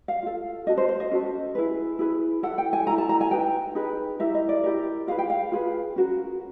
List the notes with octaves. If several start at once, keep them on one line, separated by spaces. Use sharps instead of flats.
F5
F4 A4
C#4 F#4 A4 D#5
C5
C5
D#5
C#4 F#4 A4
E4 G#4 B4
E4 G#4 B4
E4 A4 F#5
G5
G#5
E4 A4 A#5
A5
A#5
G#5
D#4 G#4 B4 G5
D#4 G#4 B4
E4 G4 A#4 E5
D#5
D5
E4 G4 A#4
F4 G#4 B4 F5
G5
F5
F4 G#4 B4
C#4 F#4 A#4